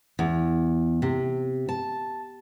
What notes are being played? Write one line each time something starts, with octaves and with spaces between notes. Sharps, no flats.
E2
C3
A5